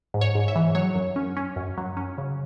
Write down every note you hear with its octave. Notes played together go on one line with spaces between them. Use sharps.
G#2
C#5
G#2
E5
E3
F#3 C#5
F#2
C#4
C#4
F#2
F#3
C#4
C#3